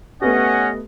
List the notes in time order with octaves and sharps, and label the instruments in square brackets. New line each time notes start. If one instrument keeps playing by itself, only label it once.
[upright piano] A3 B3 G4 [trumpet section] C#4 F#5 [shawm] D#5